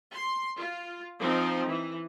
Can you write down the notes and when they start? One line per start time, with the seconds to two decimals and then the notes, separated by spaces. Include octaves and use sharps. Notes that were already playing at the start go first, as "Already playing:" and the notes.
0.14 C6
0.57 F4
1.20 F3 C4 D#4
1.67 E3